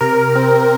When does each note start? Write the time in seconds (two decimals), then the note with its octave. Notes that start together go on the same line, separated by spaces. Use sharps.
0.01 C3 A#4
0.35 C4